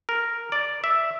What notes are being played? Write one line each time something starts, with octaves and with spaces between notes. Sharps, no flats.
A#4
D5
E5